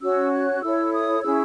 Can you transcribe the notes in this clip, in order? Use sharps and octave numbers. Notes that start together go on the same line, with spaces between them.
C#4 F#4 C#5 E6
F#6
E4 A4 C#5 E6
D#6
C#4 E4 G#4 E6